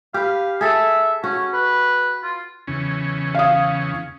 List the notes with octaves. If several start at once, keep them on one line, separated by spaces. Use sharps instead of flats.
G4 B4 F5
G#4 A4 E5
C#4 F#4
B4
F4
E2 C#3 C#4
F5 D#6